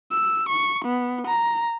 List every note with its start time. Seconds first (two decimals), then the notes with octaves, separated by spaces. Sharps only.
0.11 E6
0.49 C#6
0.85 B3
1.27 A#5